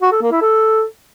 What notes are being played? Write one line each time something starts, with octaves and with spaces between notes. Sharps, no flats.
F#4
A4
A#3
E4
A4